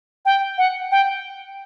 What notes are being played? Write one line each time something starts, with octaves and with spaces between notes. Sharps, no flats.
G5
F#5
G5